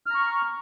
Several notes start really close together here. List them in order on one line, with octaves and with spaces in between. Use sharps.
F6 A#5 C#6